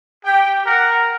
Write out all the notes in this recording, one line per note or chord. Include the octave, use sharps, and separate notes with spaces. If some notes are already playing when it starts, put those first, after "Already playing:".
G4 G5
A#4 F#5